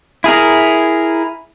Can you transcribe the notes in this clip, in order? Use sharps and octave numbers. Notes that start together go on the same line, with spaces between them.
E4 G#4 A#4